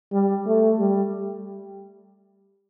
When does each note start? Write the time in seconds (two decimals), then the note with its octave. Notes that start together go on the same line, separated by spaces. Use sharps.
0.12 G3
0.46 A3
0.79 G3